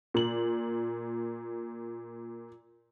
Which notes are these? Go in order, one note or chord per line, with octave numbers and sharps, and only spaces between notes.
A#2 F#7